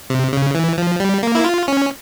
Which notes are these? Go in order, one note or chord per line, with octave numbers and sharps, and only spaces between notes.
C3
C#3
E3
F3
G3
A#3
E4
F4
C#4